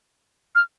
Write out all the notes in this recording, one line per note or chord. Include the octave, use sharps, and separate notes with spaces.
F6